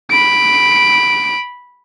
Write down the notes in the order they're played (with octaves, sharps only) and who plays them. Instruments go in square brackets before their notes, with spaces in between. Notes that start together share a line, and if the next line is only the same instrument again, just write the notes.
[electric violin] B5 D7